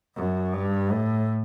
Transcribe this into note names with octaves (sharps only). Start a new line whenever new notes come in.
F#2
G2
A2